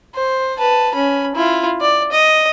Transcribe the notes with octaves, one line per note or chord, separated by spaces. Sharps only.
C5
B4 A5
C#4 B5
E4 F4
D5
D#5